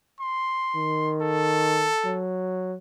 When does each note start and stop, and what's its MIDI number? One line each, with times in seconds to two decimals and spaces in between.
0.21 1.16 84
0.76 1.90 51
1.22 2.24 69
2.05 2.75 54